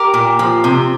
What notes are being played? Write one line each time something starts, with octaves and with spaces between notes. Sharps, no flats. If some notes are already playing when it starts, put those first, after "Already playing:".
Already playing: G4 A#4
A#2
F3
C3